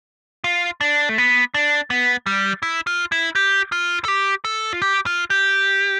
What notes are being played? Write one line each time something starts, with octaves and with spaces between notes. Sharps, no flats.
F4
D4
A3
B3
D4
B3
G3
E4
F4
E4
G4
F4
A4
G4
A4
F4
G4
F4
G4